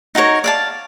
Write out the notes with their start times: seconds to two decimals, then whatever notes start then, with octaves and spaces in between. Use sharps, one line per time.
0.15 D#4 F#4 A#4 C#5
0.44 D5 F5 A5